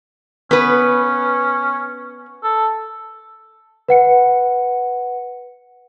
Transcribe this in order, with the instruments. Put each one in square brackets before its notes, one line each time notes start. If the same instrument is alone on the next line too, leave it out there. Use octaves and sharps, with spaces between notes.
[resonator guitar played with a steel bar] B3 B4 [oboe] C#4
[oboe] A4
[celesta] B4 F#5 C#7